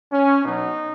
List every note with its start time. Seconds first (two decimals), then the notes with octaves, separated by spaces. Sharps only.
0.12 C#4
0.44 B2 F#3 D#4